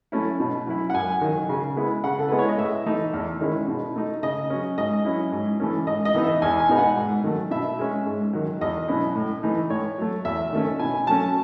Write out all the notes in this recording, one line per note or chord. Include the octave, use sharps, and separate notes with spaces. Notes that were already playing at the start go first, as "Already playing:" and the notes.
F#3 A3 C#4 E4
B2
F#3 C#4 E4
F#5
F#2 G#5
D#3 F#3
C#3
G#3 B3 E4
C#3 F#5
A4
G#3 B3 E4 B4
C#5
D#5
A2 E5
E3 A3 D#4
E2
D#3 G#3 C#4 E4
B2
A3 D#4
C#3 D#5
F#3 C#4
G#2 D#5
F#3 C#4 E4
G#2
E3 A3 C#4
G#2 D#5
D#5
E3 B3 D#4
E5
E2 G#5
G#5
B2 G#3 B3 D#4
F#5
G#2
D#3 F#3 A3
B2 E5
G#3 C#4
G#2
D#3 F#3
E2 D#5
B2 F#3 C#4 E4
A2
E3 A3 D#4
A2 C#5
F#3 A3
E2 E5
D#3 A3 C#4
B2 G#5
F#3 A3 C#4 A5